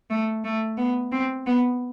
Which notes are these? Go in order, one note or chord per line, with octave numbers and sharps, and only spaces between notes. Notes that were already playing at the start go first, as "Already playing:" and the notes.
A3
A3
B3
C4
B3